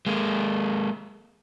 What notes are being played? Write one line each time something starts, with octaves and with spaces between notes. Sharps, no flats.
G#3 A#3